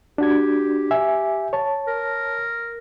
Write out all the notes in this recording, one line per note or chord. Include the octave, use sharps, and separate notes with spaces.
D4 F#4 G4 G#6
E5 G#5
C#5 A5
A#4